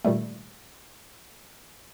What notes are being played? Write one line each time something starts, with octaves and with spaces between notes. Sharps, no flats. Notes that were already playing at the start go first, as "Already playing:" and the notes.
A#2 D#3 G3 A3